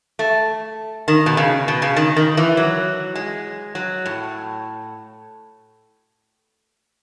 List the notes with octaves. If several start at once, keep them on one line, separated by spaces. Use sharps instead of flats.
A3
D#3
B2
C#3
B2
C#3
D#3
D#3
E3
F#3
G#3
F#3
A2